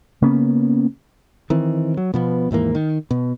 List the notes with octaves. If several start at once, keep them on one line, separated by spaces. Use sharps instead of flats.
C#3 A#3 B3 C#4
D#3 E3 C4
F#3
B2 F3 B3
D#2 G#2 E3 A#3
D#3
B2